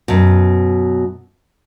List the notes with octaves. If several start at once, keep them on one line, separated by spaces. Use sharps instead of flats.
F#2 B2